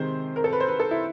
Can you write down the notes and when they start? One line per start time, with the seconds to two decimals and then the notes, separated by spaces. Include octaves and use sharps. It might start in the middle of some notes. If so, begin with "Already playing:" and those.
Already playing: C3 D#3 G#3 C5
0.36 A#4
0.44 A4
0.53 B4
0.60 C5
0.68 B4
0.80 A4
0.91 E4